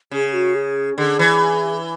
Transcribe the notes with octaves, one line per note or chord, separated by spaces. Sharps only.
C#3 G#4
F#4
G#4
D3 G#4
E3